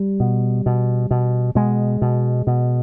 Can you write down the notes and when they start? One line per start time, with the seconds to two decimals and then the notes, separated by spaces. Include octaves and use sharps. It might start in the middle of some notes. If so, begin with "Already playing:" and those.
Already playing: G3
0.20 B2
0.66 B2
1.11 B2
1.55 B2 G#3
2.02 B2
2.47 B2